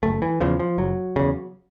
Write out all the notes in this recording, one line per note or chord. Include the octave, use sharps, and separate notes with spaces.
F#1 A3
E3
E2 C#3 F3
F3
F#1 F#3
E2 C#3